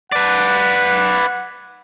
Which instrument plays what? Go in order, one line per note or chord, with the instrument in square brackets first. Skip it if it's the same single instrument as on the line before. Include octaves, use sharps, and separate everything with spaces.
[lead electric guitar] B4 D5 [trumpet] F#5